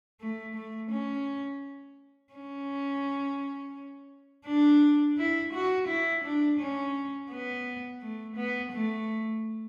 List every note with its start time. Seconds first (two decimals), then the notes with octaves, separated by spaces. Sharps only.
0.21 A3
0.55 A3
0.91 C#4
2.33 C#4
4.46 D4
5.18 E4
5.53 F#4
5.88 E4
6.24 D4
6.59 C#4
7.30 B3
8.01 A3
8.36 B3
8.72 A3